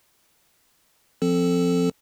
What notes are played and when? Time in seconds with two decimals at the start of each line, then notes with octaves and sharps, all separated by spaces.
1.22 F3 C4 A4